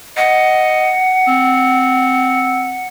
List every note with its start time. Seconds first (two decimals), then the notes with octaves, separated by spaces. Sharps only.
0.17 D#5 F#5
1.28 C4